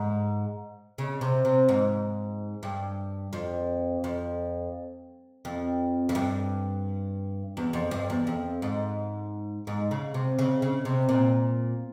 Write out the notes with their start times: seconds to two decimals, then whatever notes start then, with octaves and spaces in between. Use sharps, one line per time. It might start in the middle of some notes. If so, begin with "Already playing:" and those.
Already playing: G#2
0.98 C#3
1.21 C3
1.45 C3
1.69 G#2
2.63 G2
3.33 F2
4.04 F2
5.45 F2
6.09 F2
6.15 G2
7.57 E2
7.73 F2
7.91 G2
8.10 E2
8.27 F2
8.62 G#2
9.67 G#2
9.91 C#3
10.14 C3
10.39 C#3
10.62 C#3
10.85 C3
11.09 A#2